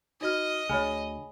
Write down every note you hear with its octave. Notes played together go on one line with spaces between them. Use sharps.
D#4 F#4 D#5 F6
D2 G#4 C#5 G#5 B5